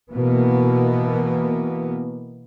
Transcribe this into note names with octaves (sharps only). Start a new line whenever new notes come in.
B2 E3 A#3 B3